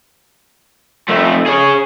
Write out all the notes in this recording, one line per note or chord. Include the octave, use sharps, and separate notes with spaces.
F2 A3
G#4 C#5